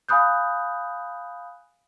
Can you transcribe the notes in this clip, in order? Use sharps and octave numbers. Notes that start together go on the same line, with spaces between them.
F5 G#5 B5 D#6 F#6 G6